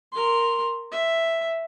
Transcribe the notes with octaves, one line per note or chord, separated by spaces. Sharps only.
A#4 C6
E5